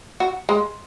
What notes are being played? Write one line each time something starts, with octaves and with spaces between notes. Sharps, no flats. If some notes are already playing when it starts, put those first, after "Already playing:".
F#4
G#3